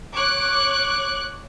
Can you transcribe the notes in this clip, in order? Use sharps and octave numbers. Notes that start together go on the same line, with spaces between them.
C#5 D6 F#6